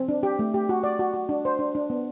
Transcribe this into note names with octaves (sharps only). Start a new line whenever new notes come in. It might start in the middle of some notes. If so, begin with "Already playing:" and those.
Already playing: C4
D4
G4
A3
G4
F#4
D5
F#4
F#4
D4
C5
D4
D4
B3